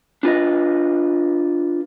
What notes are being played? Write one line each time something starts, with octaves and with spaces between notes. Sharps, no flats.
D4 F4 B4 D#5